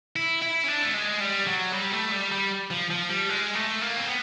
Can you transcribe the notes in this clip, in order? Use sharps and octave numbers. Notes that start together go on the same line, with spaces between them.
E4
E4
C#4
D4
A3
G#3
G3
F#3
G3
A3
G3
G3
F3
F3
G3
G#3
A3
A#3
C4
B3